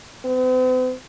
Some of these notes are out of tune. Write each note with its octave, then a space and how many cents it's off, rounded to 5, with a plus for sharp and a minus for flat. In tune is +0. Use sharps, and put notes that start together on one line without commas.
C4 -45